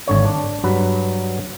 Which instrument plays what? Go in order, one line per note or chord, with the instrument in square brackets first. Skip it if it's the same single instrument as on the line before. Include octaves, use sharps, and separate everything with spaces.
[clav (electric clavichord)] G#1 D3 C#5
D4
G2 F#3 B4